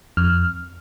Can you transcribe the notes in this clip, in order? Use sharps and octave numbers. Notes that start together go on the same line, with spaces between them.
F2 F6